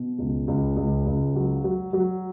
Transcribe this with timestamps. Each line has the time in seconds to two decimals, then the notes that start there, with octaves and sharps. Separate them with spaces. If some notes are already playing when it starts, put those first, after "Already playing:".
Already playing: B2
0.18 C#2
0.47 C#2
0.76 C#2
1.06 C#2
1.36 F#3
1.64 F#3
1.93 F#3